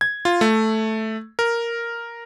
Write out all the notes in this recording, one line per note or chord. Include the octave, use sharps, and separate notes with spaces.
G#6
F4
A3
A#4